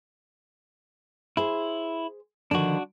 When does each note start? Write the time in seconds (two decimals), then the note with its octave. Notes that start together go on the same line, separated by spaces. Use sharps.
1.37 E4 G#4 C5
2.51 D3 D#3 F3 D4 F#4